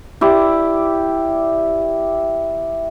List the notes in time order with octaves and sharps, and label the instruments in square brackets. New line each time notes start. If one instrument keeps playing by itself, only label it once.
[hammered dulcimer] E4 G4 D5